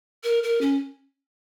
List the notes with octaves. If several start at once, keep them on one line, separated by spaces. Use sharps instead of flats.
A#4
A#4
C#4